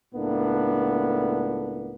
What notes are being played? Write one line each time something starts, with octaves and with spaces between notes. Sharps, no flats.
C#2 A2 A#3 B3 D4